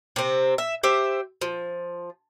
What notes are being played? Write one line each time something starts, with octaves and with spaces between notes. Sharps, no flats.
C3 C4
E5
G4 C5 E5
F3